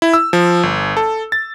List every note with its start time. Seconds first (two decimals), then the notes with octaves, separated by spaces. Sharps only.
0.02 E4
0.14 E6
0.33 F3
0.63 G1
0.97 A4
1.32 A6